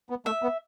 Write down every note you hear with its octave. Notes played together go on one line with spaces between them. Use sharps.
B3
A3 E5
B3